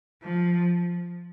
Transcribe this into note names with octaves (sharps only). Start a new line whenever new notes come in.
F3